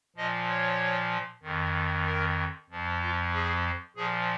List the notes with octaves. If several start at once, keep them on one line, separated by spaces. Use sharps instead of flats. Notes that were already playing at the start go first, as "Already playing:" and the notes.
A#2 F3 D#5
C#5
F2 D#3
A#4
F2 F3
F4
G#4
A#2 F3 G#4